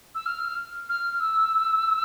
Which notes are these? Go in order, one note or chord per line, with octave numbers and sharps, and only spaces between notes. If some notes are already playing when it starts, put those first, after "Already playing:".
E6
F6
F6
E6